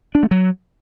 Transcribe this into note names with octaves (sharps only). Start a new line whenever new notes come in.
D4
A3
F#3